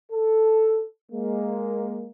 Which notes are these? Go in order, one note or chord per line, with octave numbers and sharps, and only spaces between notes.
A4
G#3 A#3